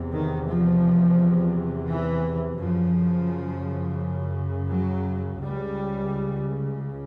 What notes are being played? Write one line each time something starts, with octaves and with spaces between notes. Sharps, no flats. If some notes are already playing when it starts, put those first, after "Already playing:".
Already playing: E2 C3
D#3
F3
E3
F#2 C#3 F3
F#3
C#2 C#3 G3